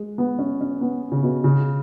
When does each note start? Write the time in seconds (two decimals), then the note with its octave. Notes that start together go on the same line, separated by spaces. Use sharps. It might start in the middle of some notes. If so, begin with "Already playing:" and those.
Already playing: G#3
0.18 B3
0.39 C#4
0.61 C#4
0.81 B3
1.12 C#3
1.23 B2
1.44 C#3